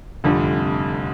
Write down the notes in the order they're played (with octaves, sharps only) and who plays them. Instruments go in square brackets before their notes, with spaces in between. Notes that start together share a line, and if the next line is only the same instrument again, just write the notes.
[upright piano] F1 F2 D3 G3